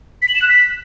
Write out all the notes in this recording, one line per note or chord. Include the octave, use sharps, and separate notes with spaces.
B6
F#7
E7
F#6
B6